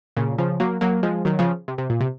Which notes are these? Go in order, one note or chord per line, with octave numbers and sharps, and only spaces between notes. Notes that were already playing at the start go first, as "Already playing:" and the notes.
A#2 C#3
C#3 F3
F#3 A#3
F#3 A#3
F3 G#3
D#3 F#3
C#3 F3
C3
C3
A#2
C3